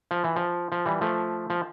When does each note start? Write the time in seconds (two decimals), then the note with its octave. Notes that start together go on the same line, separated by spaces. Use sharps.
0.11 F3
0.24 E3
0.36 F3
0.72 F3
0.86 E3 G3
1.01 F3 A3
1.50 F3